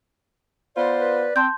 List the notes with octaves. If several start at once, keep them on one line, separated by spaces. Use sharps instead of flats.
B3 F4 C5 D5
B4
C4 A5 C6 G6